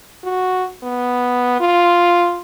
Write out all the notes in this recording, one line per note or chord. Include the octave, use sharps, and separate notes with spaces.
F#4
B3
F4